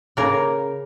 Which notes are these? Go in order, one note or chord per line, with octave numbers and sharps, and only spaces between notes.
C#3 A#3 A#4